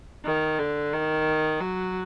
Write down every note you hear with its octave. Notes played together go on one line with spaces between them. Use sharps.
D#3
D3
D#3
F#3